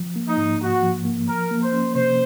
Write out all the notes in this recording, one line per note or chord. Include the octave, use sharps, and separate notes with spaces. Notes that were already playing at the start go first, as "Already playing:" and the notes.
Already playing: F3
A#3
D#4
G#2
G#2 F#4
F3
A#3
F3 A#4
A#3
C5
C#4
C3 C5